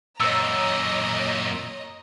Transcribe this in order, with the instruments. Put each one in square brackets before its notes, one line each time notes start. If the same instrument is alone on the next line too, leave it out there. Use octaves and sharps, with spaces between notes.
[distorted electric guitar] F#2 A#2 [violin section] C#5 D#5 A#5 [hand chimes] E6